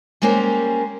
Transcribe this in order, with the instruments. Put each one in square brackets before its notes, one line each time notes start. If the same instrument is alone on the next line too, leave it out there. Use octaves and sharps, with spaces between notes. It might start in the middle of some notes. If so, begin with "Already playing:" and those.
[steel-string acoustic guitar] G3 G#3 A#3 C#4 A#4 C5